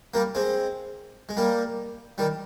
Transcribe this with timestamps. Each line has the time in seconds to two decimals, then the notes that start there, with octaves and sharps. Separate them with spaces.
0.14 G3 A#3
0.35 G#3 C4
1.29 G#3
1.37 G3 A#3
2.18 D#3 G3